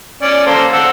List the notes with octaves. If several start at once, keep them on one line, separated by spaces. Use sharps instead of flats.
C#4 D5
A#3 A4 C5
C5 F#5 E6